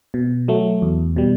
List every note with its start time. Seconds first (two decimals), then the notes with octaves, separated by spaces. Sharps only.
0.14 B2
0.48 F#3 A3
0.82 E2
1.16 B2 G3